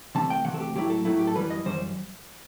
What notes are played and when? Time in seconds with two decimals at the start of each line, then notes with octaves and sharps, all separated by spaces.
0.15 C3 E3 A3 A5
0.30 G5
0.45 C3 E3 A3 F#5
0.54 A4
0.60 G4
0.75 A2 F#3 A3 E4 G4
0.90 A4
1.05 A2 F#3 A3 E4
1.19 G4
1.27 A4
1.35 F#2 E3 G3 B4
1.50 D#5
1.65 F#2 E3 G3 C5